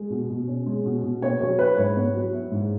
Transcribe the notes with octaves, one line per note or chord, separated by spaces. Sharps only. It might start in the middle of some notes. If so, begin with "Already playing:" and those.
Already playing: G#3
B2
B2
C#4
G#3
B2
B2
B3 C#5
F#3 C#5
E4 B4
G#2 C#5
B3
F#3
E4
G#2